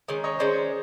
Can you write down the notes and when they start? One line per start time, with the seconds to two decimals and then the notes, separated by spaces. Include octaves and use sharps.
0.08 D#3 G#3 C#4
0.24 C#5 D#5
0.39 D#3 G#3 C#4 C5 D5